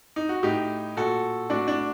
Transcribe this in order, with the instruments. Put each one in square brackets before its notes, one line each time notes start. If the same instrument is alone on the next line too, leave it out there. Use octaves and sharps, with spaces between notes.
[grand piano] D#4
F#4
A2 D#4 G4
A#2 F#4 A4
A2 D4 F#4
D4